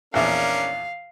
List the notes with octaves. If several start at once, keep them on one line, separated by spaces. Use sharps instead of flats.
A#1 E2 C#4 D4 A#4 F5